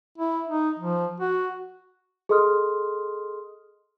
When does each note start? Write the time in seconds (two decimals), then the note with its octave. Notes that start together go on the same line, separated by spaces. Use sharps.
0.18 E4
0.47 D#4
0.79 F3
1.20 F#4
2.29 G#4 A4 D#5 C6 D#6 F6